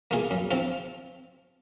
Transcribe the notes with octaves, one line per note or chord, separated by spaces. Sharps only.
A#3 F4 G#4
F#2
F3 C4 F4